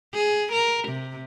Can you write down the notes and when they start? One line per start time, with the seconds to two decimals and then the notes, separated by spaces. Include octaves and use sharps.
0.14 G#4
0.52 A#4
0.88 C3